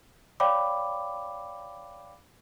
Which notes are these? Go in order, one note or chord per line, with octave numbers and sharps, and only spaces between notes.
C#5 D5 F5 G5 B5 D6